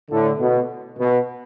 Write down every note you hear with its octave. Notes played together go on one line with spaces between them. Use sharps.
A2 D3
B2
B2